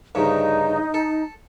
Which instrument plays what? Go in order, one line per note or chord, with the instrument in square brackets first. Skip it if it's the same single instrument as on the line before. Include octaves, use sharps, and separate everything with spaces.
[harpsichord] D2 G2 C#3 [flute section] D#4
[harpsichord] A4